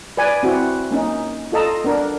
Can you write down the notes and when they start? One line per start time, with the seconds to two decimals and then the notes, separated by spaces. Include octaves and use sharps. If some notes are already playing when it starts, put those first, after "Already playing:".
0.17 B4 D5 G#5
0.43 C4 E4 F#4
0.91 A#3 C#4 D#4
1.52 F4 A4 D#5 A5 A#5
1.84 B3 D4 A#4